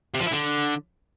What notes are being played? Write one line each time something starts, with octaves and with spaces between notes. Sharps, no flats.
C3
F3
E4
D3